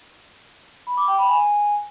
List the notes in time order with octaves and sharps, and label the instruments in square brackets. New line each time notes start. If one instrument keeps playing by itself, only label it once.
[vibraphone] B5
D6
G5
B5
G#5